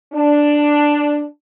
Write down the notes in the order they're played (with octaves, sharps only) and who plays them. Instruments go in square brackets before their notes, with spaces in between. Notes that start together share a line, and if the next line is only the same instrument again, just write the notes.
[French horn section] D4